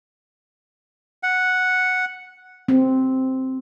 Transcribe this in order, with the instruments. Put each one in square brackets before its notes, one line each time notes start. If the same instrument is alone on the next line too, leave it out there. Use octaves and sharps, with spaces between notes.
[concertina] F#5
[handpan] C4